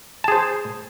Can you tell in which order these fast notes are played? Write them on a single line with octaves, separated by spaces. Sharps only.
A5 G#4 C5